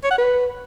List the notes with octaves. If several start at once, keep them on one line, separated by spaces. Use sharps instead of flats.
C#5
F#5
B4